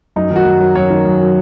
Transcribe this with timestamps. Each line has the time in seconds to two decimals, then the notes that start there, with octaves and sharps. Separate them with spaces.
0.16 F#2 D#4
0.31 D#3
0.36 F#4
0.45 F#2
0.61 F#3
0.75 F#2 C#5
0.90 D#3
1.05 F#2
1.20 F#3